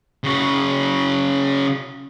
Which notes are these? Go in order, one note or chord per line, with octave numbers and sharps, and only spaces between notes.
C#3 F#4